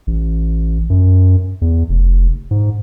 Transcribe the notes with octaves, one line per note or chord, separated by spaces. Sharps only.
A1
F#2
E2
F1
G#2